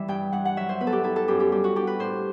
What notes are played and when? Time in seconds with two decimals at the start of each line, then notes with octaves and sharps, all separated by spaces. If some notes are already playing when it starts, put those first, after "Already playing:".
Already playing: E3 G3 E5
0.08 G2 G5
0.32 G2 F#5
0.45 F#5
0.57 F#3 E5
0.69 C5
0.80 B3 B4
0.87 A4
0.92 G4
1.04 E4 A4
1.16 A4
1.28 F#2 G4
1.40 G4
1.52 G3 G4
1.64 F#4
1.75 D4 G4
1.87 B4
1.99 A2 C5